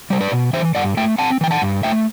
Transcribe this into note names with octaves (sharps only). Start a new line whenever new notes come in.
G3 C5
B4 D5
B2
E3 C5 E5
G2 D5 F#5
A3 E5 G5
C4 F#5 A5
E3 G5
F#5 A5
G2
A3 E5 G5